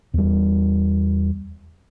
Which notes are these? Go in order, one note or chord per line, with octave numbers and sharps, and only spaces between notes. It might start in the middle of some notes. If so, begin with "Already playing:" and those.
E2 G3